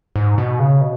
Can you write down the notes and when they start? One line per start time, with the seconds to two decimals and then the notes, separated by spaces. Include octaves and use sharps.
0.16 G#2
0.38 B2
0.59 C#3
0.81 B2